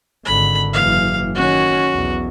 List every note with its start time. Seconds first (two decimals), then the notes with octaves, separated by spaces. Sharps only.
0.25 G#1 D3 B5
0.73 F#1 E3 F5
1.35 D#3 C#4 F#4
1.92 B1 E2